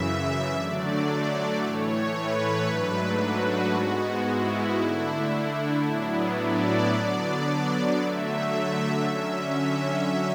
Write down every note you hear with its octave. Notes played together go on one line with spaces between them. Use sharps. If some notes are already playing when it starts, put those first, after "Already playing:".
Already playing: F#2 C#3 E3 E5
D3 F#3 A3 D4 D5
A2 E3 A3 C#5
B4
G#2 F#3 A3 D4
F#4
G#2 G#3 B3
E4
D3 A3 D4
A2 F#3 B3 D4
D5
D3 F#3 B3 D4 D5
D3 F#3 A3 E5
D3 F#3 C#4 E5
E5